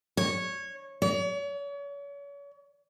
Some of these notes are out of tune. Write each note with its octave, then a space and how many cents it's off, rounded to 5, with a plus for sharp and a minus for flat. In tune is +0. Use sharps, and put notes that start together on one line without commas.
C#5 -15
C#5 +40